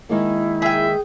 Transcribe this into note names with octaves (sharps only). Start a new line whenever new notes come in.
D#3 G#3 A#3 E4
G#4 E5 G5